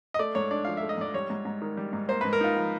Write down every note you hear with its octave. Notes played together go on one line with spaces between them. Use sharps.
D#5
A3 D5
G#2 C#5
D4 D5
F3 F5
E5
A3
D#5
G#2 D5
G3 C#5
G#2
G#2
D#3
G3
G#2
A#3 C5
G#2 B4
A#4
D#4 F4
F3